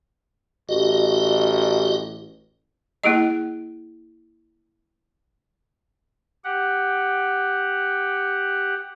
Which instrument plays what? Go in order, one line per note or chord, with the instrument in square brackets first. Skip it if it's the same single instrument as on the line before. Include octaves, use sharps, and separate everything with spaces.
[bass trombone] A1 [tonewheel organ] F#4 G4 D#5
[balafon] A#3 E4 G#4 D#5
[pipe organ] G4 F#5